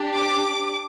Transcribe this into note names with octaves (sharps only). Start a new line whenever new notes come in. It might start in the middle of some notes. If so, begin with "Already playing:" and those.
Already playing: D4 G4
D6